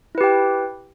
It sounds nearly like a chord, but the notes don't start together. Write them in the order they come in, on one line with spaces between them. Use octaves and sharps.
E4 B4 G4 G5